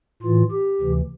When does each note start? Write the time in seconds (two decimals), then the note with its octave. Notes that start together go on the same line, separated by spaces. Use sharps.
0.22 A2 E3 F4
0.51 G4
0.81 D2 C3 E3